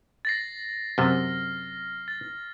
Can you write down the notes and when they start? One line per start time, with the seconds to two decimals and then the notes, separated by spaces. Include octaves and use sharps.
0.25 A6 A#6 C7
0.98 F#2 C3 F6 A6
2.08 A6